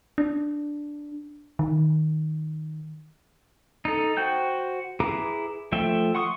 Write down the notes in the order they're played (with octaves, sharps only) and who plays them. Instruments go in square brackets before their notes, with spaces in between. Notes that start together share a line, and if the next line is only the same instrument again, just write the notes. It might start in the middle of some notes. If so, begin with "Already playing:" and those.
[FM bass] D4
D#3
[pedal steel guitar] D#4 A4
F#4 C5 G5 G6
E4 G#4 B4 A#5 D6
F3 A3 E5 G5
F#5 C6 C#6 D#6